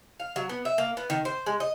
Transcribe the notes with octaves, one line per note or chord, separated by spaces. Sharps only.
F5
F#3
B3
E5
A#3
B3
D#3
C5
G#3
D#5